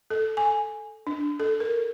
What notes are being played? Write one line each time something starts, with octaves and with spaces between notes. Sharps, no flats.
A4
G#5
D4
A4
A#4